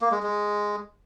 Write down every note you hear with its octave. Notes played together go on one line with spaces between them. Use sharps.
A#3
G#3
G#3